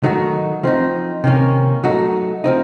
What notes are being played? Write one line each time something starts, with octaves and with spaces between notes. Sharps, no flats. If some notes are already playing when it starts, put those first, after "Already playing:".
D#3 F#3 A3 D#4 F#4
F3 C4 D#4
C3 D#3 A#3 C#4
F#3 A3 D#4 F#4
F3 C4 D#4